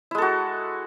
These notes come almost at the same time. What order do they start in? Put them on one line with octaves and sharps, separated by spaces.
E4 G#3 A4 F#4